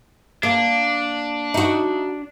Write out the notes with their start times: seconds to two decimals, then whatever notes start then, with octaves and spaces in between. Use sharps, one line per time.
0.43 A#3 D4
1.54 D#4 F#4